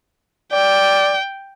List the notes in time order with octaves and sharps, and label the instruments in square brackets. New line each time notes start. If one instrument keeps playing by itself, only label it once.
[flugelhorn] D5 [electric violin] G5